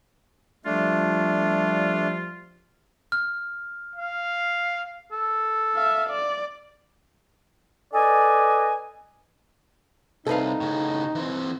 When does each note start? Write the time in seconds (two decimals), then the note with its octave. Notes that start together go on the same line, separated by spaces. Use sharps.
0.66 F3 G3 A3 D4 F4
3.12 F6
3.96 F5
5.12 A4
5.76 E5 F5
6.09 D5
7.94 A4 B4 D5 D#5 G#5
10.27 C2 D#4 A4 B4 F5
10.61 A2 C#3
11.15 E3 C4